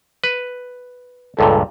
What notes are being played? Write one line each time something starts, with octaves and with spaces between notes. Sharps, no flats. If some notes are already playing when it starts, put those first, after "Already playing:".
B4
C#2 G2 A#2 A4